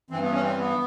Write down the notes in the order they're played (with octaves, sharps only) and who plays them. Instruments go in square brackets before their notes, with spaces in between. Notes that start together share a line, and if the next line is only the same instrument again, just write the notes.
[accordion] G2 E3 C4
B3
C#4
C4
B3